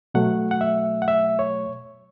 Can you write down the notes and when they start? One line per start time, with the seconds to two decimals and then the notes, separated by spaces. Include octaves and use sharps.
0.14 B2 F#3 A3 F#5
0.51 F#5
0.61 E5
1.02 F#5
1.08 E5
1.39 C#5